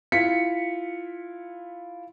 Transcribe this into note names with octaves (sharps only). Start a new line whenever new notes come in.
E4 F4 B6 C#7